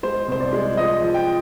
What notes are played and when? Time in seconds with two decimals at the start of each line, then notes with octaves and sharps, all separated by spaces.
0.03 G#3 C5
0.28 C2 C5
0.40 D5
0.53 G#3
0.77 F3 D#5
1.02 F3
1.14 G5